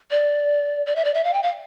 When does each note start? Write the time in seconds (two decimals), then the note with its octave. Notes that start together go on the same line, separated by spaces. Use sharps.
0.11 D5
0.86 D5
0.96 E5
1.05 D5
1.14 E5
1.24 F5
1.34 G5
1.43 F5